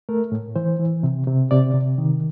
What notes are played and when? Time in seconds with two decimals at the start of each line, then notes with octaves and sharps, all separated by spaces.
0.09 A3 A#4
0.32 A2
0.56 E3 C5
0.80 E3
1.03 C3
1.27 C3
1.51 C3 D5
1.74 C3
1.98 D#3